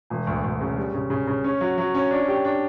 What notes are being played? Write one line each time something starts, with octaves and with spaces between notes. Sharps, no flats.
E1
D2
D2
C#3
G3
C#3
C#3
C#3
C#4
F#3
F#3
C#4
D4
G4
D4